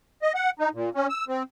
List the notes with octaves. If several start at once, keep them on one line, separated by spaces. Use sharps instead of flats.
D#5
F#5
D#4
A#2
C#4
E6
C4